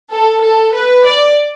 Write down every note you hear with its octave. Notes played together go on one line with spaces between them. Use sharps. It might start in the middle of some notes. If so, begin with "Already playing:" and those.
A4
A4
B4
D5